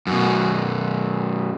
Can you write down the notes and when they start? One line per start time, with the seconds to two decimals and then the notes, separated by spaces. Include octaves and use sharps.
0.07 F#2 B2